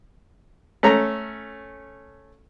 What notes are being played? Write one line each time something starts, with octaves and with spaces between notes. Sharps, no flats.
A3 C#4 A#5